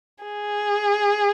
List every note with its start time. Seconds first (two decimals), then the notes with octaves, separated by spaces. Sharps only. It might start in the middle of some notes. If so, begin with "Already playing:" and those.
0.24 G#4